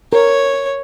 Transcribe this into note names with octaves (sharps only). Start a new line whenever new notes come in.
A#4 C#5